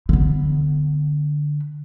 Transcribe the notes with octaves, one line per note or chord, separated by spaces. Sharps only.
D3 B3